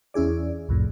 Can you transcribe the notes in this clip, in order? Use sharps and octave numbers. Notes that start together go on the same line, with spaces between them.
E2 C#4 E4 G#4 D5
C2 F2 A2